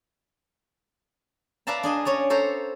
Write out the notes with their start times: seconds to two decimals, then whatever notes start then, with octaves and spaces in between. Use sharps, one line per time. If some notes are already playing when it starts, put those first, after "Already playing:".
1.67 B4 D5 E5 F5 A5 A#5
1.83 D4 G#4 D#5
2.05 C#4 C#5 D5 A#5
2.30 A4 C5 C#5 A#5